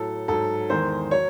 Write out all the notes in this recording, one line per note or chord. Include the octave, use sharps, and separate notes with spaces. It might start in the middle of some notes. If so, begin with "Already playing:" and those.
Already playing: A2 F#3 A4
G#2 F#3 A4
E2 D#3 G#3 C5
F#3 C#5